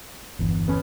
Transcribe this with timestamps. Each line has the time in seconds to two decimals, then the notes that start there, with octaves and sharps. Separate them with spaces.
0.39 G1 E2
0.68 B3 C#4